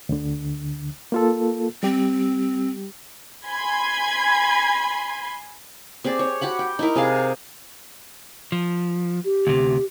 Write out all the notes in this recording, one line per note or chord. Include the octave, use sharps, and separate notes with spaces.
D2 D3
A#3 F4 A4
G3 C4 G4
G#5 B5 C6 G#6
C4 G4 G#4 D5
C#5
F#4 G4 F#5 B5
G5
D#4 E4 A#4
C3 G#4 F5
F3
G4
D2 C3